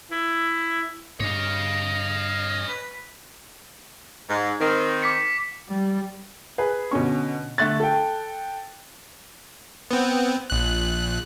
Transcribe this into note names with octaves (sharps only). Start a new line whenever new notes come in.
E4
G2 C#5 D#5 F5
B4
G#2
D#3 C4
D6 B6 C#7
G3
G#4 B4
B2 D3 C#4 C#6
D3 A3 E5 C#6 F#6 A6
A4 G5
B3 C4
A#1 F#6